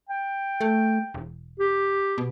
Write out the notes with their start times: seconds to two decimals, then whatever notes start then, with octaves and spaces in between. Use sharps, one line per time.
0.09 G5
0.61 A3
1.14 E1
1.60 G4
2.18 B2